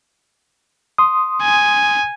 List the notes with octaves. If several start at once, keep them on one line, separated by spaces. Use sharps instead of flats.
C6 D#6
G#5